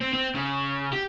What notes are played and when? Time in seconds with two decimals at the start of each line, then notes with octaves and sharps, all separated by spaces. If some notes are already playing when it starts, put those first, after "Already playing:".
0.01 C4
0.13 C4
0.35 C#3
0.93 G4